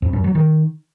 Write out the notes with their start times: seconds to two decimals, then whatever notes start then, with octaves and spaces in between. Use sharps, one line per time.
0.02 F2
0.13 F#2
0.24 F#3
0.35 D#3